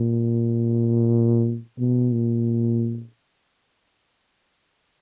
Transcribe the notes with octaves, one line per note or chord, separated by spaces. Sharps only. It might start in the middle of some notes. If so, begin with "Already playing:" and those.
Already playing: A#2
B2
A#2